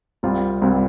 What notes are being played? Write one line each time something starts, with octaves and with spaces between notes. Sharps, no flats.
C2 C3 G3 C4 F4
C2 C3 G3 C4 F4